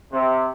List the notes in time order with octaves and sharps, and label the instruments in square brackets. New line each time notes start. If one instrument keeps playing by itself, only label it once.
[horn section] C3